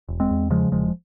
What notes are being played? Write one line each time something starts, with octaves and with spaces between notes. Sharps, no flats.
E1
G#3 C4
E2
C#3 F3 G#3
E1 F3 G#3